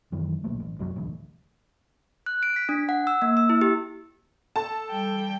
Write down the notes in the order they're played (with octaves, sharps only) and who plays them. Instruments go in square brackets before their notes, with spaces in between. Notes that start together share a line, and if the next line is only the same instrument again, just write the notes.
[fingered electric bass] F#2 D#3 E3
D1 B1 A#2 A3
A1
C2 F#2 F#3
D#1 A1 D2
[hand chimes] F#6
D7
B6
D4
F#5
E6
A#3
E6
E4
G4
[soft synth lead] A4 [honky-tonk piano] A5
[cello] G3 G5